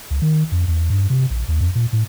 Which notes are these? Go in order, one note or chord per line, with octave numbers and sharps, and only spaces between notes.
C#2
D#3
F2
E2
G2
C3
A#1
D#2
F2
A#2
A2